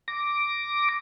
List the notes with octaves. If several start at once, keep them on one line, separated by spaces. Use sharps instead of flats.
D6 A#6